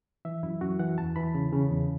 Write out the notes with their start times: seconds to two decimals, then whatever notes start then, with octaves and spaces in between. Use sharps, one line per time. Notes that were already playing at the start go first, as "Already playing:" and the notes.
0.25 E3 E5
0.43 F#2 E4
0.61 F#2 F#4
0.79 E3 F#5
0.98 E2 A5
1.16 E3 B5
1.35 C#3
1.53 C#3
1.71 E2